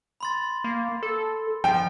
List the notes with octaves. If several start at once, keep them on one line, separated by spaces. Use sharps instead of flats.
B5 C6 A6
A#3
A4
F3 G5